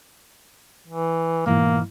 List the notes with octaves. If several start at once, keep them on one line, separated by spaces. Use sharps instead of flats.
E3
G#2 B2 E3 A#3